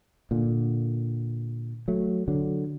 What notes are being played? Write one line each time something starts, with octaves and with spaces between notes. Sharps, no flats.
A#2 D3
F#3 A3
D3 F#3